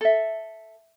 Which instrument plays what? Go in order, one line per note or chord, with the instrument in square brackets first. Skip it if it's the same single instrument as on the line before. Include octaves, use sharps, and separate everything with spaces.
[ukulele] A4 E5